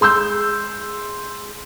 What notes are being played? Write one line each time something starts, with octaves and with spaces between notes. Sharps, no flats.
G#3 C6 E6 G6